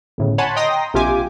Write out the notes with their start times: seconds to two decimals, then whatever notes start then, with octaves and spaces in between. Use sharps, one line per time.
0.18 G1 A2 C#3
0.38 C#5 F#5 G#5 A5 B5 C6
0.56 D#5 G5 A#5 C6 D#6 A#6
0.94 A#1 C3 F4 G4 G#5 D6